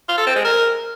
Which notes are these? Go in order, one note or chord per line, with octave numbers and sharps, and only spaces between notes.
F4
A4
C4
G#3
A#4